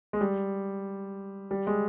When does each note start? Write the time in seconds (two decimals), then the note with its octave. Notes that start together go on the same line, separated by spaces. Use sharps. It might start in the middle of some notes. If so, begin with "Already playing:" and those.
0.13 G#3
0.21 G3
1.51 G3
1.67 G#3